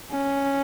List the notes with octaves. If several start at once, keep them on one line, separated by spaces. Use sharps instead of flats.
C#4